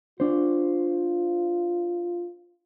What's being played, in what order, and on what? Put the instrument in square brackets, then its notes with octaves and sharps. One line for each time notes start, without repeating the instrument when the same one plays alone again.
[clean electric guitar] D4 C5 [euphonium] F4